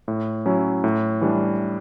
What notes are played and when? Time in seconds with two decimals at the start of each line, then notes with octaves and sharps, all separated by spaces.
0.08 A2
0.46 F#3 C#4 E4
0.84 A2
1.21 E3 G3 D4